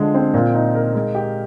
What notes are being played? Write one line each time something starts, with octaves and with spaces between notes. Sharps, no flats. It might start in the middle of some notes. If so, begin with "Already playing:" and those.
Already playing: D3 F3 G#3
C4
A#2
D#4
A#4
G#3
G4